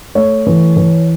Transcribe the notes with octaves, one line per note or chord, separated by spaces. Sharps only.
A3 C#5
E3
E3